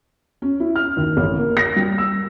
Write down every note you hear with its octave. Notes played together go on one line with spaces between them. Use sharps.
C#4
E4
F6
D#2
A1
A#3
A#6
G3
E6